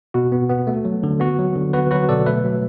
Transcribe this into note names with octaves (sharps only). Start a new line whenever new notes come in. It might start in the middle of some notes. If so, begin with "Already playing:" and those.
B2 F#4
B3
B3
A3
F#3
D3
B3 F#4
F#3
D3
B3 F#4 B4
F#3 F#4 B4
B2 A4 D5
A3 B4 E5
F#3